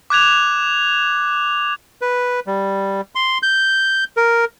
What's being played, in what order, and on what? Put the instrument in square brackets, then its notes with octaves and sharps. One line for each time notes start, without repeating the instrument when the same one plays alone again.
[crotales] D6 F#6 G#6 F7
[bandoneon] B4
G3
C6
G6
A#4